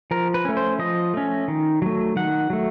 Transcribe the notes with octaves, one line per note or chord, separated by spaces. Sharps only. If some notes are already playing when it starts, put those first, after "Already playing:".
F3 A#4
B4
A3 C#4
C5
F3 D#5
A3 C#4
D#3
F#3 A3
D#3 F#5
F#3 A3